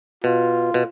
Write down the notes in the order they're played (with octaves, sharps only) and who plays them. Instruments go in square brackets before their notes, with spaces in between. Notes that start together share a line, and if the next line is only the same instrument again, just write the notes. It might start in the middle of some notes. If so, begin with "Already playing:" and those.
[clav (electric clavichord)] B2 [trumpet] F4
[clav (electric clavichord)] B2